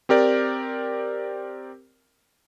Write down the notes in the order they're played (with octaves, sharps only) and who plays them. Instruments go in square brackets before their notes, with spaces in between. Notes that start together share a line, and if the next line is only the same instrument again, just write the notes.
[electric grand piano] C4 G4 A#4 D5